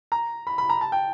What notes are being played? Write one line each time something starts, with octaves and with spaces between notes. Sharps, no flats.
A#5
B5
B5
A#5
A5
G5